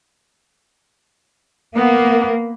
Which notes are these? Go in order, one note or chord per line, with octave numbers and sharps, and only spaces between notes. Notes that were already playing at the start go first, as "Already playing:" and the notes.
A#3 B3